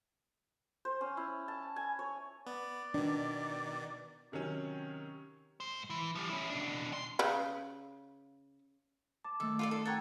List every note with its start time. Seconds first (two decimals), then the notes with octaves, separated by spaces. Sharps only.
0.85 C5
1.01 C#4
1.17 E4
1.48 A5
1.76 G#5
1.99 C#5
2.47 B3 D5
2.94 B2 D#3 D4
4.32 C3 D#3 F#3 C#4
5.60 G#2 C5
5.90 E3
6.15 F3 G3
6.30 C#4 E4
6.50 B2 D4
6.92 C#2 C6
7.19 C#3 B4
9.24 A5 D6
9.40 D#3 A3 A4
9.59 F4 A4 D5
9.71 D#4 A4
9.86 C#5 F#5 G5 A#5 A6